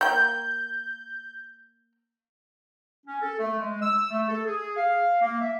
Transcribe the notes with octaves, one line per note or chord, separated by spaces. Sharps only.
A#3 G5 G6
C#4
A4
A3
G#3
E6
A3
A4
G#4
F5
A#3
E5